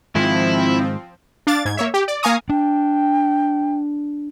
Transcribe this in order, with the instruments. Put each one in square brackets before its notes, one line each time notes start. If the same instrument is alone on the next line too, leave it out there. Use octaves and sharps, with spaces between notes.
[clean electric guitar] G#2 D#3 G#3 [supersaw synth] F3 C4 [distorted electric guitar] E4
[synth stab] D4 F5 D6 A6
G#2 G#6
A#3 C#5 E5
G4
D5
A#3 F5 G#5 A#5 C#6 D#6
[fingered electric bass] D4 [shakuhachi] G5